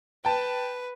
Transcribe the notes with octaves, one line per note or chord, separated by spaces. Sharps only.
B4 G5 A5